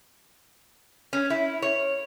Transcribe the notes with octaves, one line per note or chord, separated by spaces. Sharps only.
C#4
E4
C#5